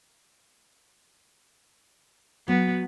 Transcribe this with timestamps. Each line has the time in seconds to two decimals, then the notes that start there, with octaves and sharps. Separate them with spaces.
2.48 F#3 B3